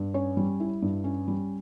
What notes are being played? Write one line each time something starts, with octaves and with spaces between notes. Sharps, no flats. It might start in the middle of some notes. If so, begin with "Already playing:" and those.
Already playing: G2
C#4 C#5
G3
E4
G2
C#4
G3